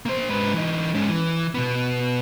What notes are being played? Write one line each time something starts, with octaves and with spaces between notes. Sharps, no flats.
A#3 C5
G#2 B4
E3 D#4
G#2 C#4
E3
B2 B3